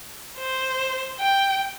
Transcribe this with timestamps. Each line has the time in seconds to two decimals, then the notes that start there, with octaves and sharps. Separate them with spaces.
0.38 C5
1.19 G5